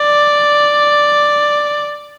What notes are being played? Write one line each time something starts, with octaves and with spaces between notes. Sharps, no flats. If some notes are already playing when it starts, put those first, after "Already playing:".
Already playing: D5